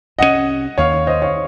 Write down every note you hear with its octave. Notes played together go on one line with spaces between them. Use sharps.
C2 C3 F#3 C#4 D#5 F#5
D#2 D#3 A#3 C#5 F5
C5 D#5
C#5 F5